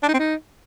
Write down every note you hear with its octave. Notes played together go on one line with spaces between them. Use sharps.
D4
D#4
C4
D#4